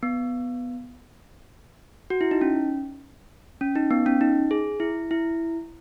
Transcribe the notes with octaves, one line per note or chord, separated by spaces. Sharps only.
B3
F#4
E4
D#4
C#4
C#4
D#4
B3
C#4
D#4
G#4
E4
E4